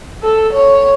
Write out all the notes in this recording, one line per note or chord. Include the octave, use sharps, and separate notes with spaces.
A4
C#5